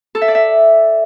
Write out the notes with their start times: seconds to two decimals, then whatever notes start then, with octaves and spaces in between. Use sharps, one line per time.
0.15 A4
0.21 E5
0.28 D5
0.35 E5